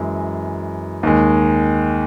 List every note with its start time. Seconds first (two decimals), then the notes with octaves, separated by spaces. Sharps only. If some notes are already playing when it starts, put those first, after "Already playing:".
Already playing: F#2 E3 G#3
1.03 D#2 D#3 G#3